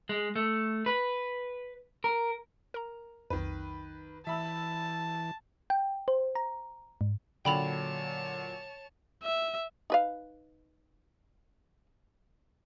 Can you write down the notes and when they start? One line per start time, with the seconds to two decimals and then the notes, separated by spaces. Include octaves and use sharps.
0.09 G#3
0.36 A3
0.86 B4
2.04 A#4
2.74 A#4 A#5
3.30 B1 F2 D#3 B4
4.27 E3 E5 A5 B5 E6
5.70 G5
6.08 C5
6.35 A#5
7.01 G#2
7.45 A#2 D3 F#3 C#5 G5 A5 B5 F7
9.24 E5
9.90 D#4 B4 F5